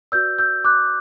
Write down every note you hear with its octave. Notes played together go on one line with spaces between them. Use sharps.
F#4 B4 D5 E6 G6
E6 G6
D6 F#6